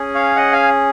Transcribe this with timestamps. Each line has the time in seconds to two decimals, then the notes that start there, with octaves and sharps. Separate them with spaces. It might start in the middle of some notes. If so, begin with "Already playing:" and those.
Already playing: C#4 G#4
0.15 C#5 F5
0.36 D#5 F#5
0.52 F5 G#5